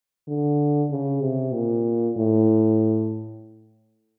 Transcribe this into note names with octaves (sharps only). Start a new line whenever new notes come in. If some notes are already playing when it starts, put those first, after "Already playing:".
D3
C#3
C3
A#2
A2